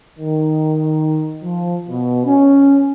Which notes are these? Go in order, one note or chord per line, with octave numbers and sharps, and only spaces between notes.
D#3
F3
B2
C#4